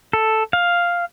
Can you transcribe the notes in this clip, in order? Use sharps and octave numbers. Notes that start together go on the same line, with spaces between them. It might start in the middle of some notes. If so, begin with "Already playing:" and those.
A4
F5